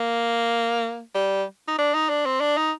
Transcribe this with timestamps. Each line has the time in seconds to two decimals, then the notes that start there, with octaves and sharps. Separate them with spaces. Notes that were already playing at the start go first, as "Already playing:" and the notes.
Already playing: A#3
1.15 G3
1.68 D#4
1.79 D4
1.94 D#4
2.09 D4
2.26 C4
2.41 D4
2.57 D#4